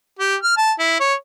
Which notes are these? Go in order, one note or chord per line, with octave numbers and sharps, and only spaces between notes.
G4
F6
A5
E4
C#5